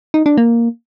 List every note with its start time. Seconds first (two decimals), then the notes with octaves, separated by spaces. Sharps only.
0.14 D#4
0.26 D4
0.38 A#3